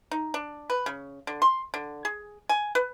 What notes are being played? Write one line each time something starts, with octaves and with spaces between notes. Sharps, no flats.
D#4
D4
B4
C#3
D3
C6
D3
G#4
G#5
B4